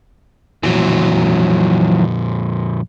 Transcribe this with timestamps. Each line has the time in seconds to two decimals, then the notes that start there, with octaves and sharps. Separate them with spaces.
0.63 F2 A#2 E3 F#3